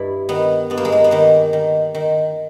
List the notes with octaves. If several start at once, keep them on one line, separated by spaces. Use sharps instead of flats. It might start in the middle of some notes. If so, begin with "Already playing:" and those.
Already playing: G2 E4
D#3 B3
G2 B3
A#3
G#3
A#3
B3
D#3 A#3
D#3
D#3